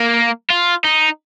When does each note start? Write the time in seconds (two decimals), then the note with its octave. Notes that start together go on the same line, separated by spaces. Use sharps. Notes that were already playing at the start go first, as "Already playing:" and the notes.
Already playing: A#3
0.50 F4
0.84 D#4